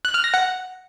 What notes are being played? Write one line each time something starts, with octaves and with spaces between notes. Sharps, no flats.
F#6
F6
A#6
F#5